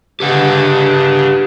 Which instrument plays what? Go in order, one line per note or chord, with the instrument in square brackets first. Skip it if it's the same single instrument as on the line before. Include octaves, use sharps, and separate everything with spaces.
[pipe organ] C#3 D4 [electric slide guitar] G4 B4 F#5